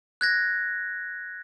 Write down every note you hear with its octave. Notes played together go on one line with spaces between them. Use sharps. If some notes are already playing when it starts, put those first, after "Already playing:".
F#6 G#6 A#6